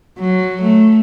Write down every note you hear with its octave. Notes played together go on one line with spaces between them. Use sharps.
F#3
A3